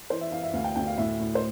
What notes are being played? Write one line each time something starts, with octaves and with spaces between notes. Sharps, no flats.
E3 C5
E5
E3 F5
E5
D2 F5
G5
D2 G5
F5
A2 E5
A2
C5